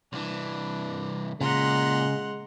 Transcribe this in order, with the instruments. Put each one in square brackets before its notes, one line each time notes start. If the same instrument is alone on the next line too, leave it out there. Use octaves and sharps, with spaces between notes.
[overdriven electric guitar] C2 E3 [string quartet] D4
[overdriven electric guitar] A#2 [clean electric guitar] C#3 [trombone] G#3 [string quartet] F#5 A#5 C6